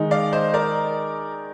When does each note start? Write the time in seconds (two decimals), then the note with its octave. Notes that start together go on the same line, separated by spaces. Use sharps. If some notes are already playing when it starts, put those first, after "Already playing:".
Already playing: D#3 G#3 D#4
0.11 D5 F5
0.33 C5 D#5
0.54 A#4 D5